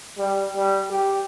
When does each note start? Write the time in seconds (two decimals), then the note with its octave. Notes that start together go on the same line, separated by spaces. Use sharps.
0.18 G3
0.56 G3
0.90 G4